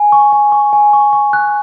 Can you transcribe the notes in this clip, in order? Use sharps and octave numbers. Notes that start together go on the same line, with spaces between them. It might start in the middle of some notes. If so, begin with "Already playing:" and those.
Already playing: G#5
C#6
G#5
C#6
G#5
C#6
C#6
F#6